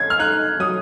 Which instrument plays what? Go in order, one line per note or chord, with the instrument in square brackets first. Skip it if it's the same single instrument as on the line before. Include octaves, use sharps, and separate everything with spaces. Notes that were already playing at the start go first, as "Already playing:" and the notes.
Already playing: [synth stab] C#4 [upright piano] G#6
[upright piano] F6
[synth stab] D#4 [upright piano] F#6
[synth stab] F#3 [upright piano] D#6